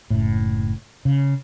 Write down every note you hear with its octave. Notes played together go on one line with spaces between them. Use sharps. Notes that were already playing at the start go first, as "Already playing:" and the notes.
F#1 A2
C#3